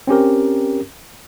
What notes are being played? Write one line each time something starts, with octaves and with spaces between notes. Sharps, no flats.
C4 C#4 G4 A#4